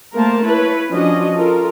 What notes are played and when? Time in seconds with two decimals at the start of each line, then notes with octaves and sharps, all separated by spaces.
0.14 A3 A#3 A#4 C5 A5
0.44 E4 B4 C#5
0.91 F3 C#4 D4 F#4 D#5
1.35 F4 A4 A#4